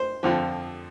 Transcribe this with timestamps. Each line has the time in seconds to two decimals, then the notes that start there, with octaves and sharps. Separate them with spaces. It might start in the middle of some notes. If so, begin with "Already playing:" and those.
Already playing: C5
0.23 F2 D3 F3